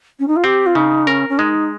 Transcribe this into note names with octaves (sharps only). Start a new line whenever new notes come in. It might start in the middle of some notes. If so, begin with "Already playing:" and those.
C#4
D#4
F4
C4 G4
F4
C#3 D#4
C#4 A#4
C#4
G#3 D#4